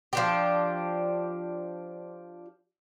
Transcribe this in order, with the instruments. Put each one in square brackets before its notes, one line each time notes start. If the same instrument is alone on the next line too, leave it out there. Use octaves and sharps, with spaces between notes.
[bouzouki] F3 D4 G4